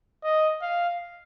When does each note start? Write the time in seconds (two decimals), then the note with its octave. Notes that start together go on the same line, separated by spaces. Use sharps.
0.23 D#5
0.62 F5